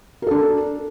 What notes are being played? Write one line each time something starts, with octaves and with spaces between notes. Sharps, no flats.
D4 A4 A#4